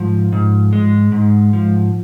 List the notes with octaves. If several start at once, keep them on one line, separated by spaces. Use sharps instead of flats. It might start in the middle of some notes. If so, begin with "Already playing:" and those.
Already playing: G#2 F3
G#2
G#3
G#2
F3